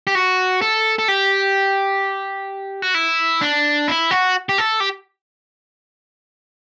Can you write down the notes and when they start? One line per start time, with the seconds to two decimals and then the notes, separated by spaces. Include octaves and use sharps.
0.07 G4
0.15 F#4
0.62 A4
0.99 A4
1.08 G4
2.82 F#4
2.95 E4
3.41 D4
3.88 E4
4.11 F#4
4.49 G4
4.58 A4
4.80 G4